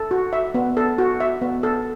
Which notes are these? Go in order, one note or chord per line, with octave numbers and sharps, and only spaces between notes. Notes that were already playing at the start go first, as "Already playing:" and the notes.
Already playing: A4
F#4
E5
B3
A4
F#4
E5
B3
A4